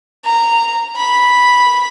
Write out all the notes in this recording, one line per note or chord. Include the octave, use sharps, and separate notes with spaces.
A#5
B5